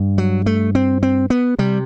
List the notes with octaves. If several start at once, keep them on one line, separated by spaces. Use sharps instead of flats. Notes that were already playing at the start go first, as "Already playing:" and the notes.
Already playing: G2
F#3
A3
C4
C4
B3
C3 G3